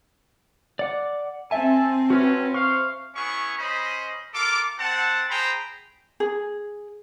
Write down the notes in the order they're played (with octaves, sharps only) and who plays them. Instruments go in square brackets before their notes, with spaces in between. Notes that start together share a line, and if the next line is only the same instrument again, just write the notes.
[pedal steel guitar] D5 F#5 D6
[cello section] C4 [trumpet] A4 [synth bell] E5 A5 [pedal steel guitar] G#5
[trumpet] C#4 [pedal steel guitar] F#4 B4
[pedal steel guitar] C5 C#6 [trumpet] F5
[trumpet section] B3 C#4 E4 G#4 C#5 C#6
C#4 C5 D#5 B5
F4 A4 A#4 F5 D6
C4 F#5 A5
G#4 C5 G5 A#5 B5
[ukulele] G#4